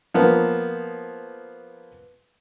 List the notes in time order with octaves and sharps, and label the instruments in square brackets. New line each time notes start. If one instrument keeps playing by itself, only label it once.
[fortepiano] F3 A#3 B3